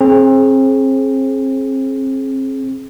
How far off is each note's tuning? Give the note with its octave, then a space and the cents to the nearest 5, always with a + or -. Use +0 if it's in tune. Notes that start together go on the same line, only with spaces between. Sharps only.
C4 +35 G#4 +20